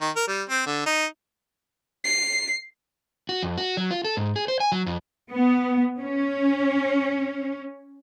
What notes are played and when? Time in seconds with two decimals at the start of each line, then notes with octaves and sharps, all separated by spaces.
0.01 D#3
0.16 A#4
0.28 G3
0.49 C4
0.66 D3
0.86 D#4
2.04 C7
3.29 F#4
3.43 F2
3.57 F#4
3.77 F#3
3.91 F4
4.04 A4
4.17 G#2
4.36 G#4
4.48 C5
4.60 G#5
4.72 F#3
4.86 F2
5.32 B3
6.00 C#4